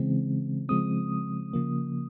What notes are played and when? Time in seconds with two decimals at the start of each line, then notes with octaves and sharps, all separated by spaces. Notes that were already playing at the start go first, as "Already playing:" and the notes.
Already playing: C#3 E3 G#3 C4
0.69 C#3 F3 G#3 C4 D#6
1.53 C#3 F3 A#3